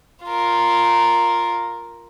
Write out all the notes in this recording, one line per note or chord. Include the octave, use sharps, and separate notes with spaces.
F4 A#4